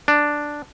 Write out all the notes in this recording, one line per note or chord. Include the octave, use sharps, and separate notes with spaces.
D4